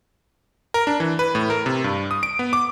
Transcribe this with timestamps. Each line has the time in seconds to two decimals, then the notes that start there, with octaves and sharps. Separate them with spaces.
0.74 A#4
0.87 D4
1.00 E3
1.19 B4
1.35 A2
1.50 A#4
1.66 C3
1.84 G2
2.11 D#6
2.23 D7
2.39 B3
2.53 D6